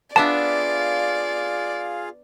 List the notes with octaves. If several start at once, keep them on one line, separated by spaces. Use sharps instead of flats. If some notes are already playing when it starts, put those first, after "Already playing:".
B3 D4 F4 G#4 D5 E5 F5 A5